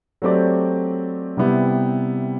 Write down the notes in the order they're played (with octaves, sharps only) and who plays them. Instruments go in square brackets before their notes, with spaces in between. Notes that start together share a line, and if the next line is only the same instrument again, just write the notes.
[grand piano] F#3 A3 C4 G4 D5
C3 G3 B3 E4 G4